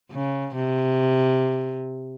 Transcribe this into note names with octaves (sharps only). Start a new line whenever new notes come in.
C#3
C3